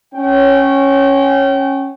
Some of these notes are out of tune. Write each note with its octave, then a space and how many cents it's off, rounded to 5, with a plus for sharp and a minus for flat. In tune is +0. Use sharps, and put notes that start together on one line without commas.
C#4 -10 G5 -30